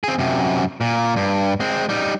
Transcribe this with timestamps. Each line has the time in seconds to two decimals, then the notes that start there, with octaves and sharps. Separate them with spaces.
0.04 C4 G#4
0.19 F#2 C3
0.81 A#2
1.16 G2
1.60 G#3 C4
1.89 G3 D#4